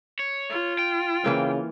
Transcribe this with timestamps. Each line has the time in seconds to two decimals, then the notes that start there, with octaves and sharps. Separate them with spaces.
0.19 C#5
0.50 F4
0.79 G5
1.24 C#3 E3 A#3 C4